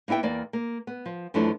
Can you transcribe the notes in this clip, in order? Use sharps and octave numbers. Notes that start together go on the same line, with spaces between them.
A#3 B3 E4 E5 G5
E2 A#3 D5
A#3
B3
F3
F#2 E3 F3 A3 D4 E4